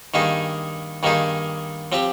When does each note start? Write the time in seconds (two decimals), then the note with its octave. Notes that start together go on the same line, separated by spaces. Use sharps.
0.14 G2 D#3 A#3 D#4 G#4
1.03 G2 D#3 A#3 D#4 G#4
1.92 F3 C4 G4